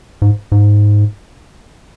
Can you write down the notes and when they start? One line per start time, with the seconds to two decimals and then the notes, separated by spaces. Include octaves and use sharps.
0.22 G#2
0.52 G#2